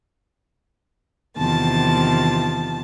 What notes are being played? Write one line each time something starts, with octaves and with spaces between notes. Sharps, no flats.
E2 C3 D#3 F3 A5 A6